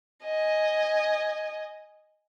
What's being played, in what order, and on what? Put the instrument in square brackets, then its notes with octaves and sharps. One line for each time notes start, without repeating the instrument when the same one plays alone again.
[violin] D#5 G#5